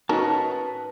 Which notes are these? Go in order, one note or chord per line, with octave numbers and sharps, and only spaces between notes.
C#4 D#4 F#4 A#4 B4 A5